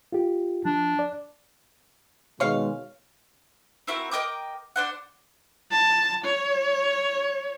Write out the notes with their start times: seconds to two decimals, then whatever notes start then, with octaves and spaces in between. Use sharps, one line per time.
0.12 F4 G4
0.65 F3 D4
0.99 D5
2.40 B2 D#3 G#3 C#5 F5
3.87 C4 E4 F#4 A#4
4.11 A#4 D#5 G5 D6
4.76 D4 C5 F#5
5.71 A5
6.24 C#5